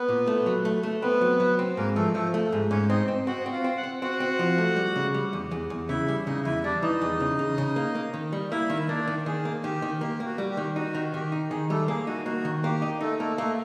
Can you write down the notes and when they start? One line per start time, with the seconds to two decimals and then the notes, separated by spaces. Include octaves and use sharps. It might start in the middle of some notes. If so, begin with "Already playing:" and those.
Already playing: B3 B4
0.09 A#2
0.27 A3
0.46 F#3
0.65 A3
0.83 A3
1.02 B3 C4 B4
1.21 F#3
1.40 F#3
1.59 C4
1.77 G#2 A#3 A#4
1.95 F3 A3 A4
2.15 F3 A3 A4
2.34 A3
2.52 G#2
2.70 G#2 C#4 C#5
2.89 C4 D#4 D#5
3.08 C4
3.27 C4 F#4 F#5
3.46 C4
3.52 F4 F5
3.64 C4
3.77 F#5
3.83 C4
4.02 C4 F#4 F#5
4.20 C4
4.39 F3
4.58 A3
4.76 G3
4.96 C#3
5.14 G3
5.33 E2
5.51 E2
5.70 E2
5.89 C#3 E4 E5
6.08 G3
6.26 C#3 D#4 D#5
6.45 E2 E4 E5
6.64 G3 D4 D5
6.82 E3 D#4 D#5
7.02 E2
7.20 C#3
7.39 C#3
7.58 C#3
7.76 A#3
7.95 A#3
8.14 D#3
8.32 G3
8.51 A#3 E4 E5
8.70 D#3
8.89 A#3 D4 D5
9.07 D#3
9.26 D#3 G#4
9.45 A#3
9.64 D#3 G4
9.82 D#3
10.01 A#3 G4
10.20 A#3
10.26 F#4
10.38 G3
10.51 G4
10.57 D#3
10.76 D#4 F#4
10.95 D#3
11.14 D#3 G4
11.32 D#4
11.51 D#3 G#4
11.70 G3 A3 A4
11.88 A#3 G#4
12.07 D#4 F#4
12.25 A#3 F#4
12.45 D#3
12.64 A#3 G4
12.82 D#4
13.00 A3 D#4 A4
13.19 A3 A#3 A4
13.38 A3 A#3 A4